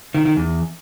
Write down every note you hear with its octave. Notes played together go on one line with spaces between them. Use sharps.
D#3
D#3
E2